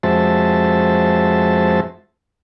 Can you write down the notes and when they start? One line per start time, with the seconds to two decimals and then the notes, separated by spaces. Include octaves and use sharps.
0.03 F2 G#3 F#4 C5 E5 A5